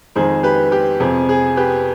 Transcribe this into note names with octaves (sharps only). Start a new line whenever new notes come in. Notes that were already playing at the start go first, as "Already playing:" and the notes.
F2 D#3 G#3 G#4 C5
G4 B4
G4
F2 C3 F3 G#4
G#4
G4 B4